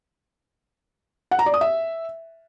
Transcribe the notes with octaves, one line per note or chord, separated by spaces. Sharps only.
F#5
A#5
D5
D#6
E5